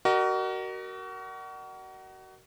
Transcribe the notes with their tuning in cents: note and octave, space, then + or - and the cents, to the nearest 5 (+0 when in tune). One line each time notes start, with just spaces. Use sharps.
F#4 +30 A#4 +0 D#5 -40